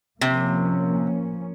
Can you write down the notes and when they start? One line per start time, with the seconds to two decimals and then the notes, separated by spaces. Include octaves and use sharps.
0.21 C3 F3 A#3 C#4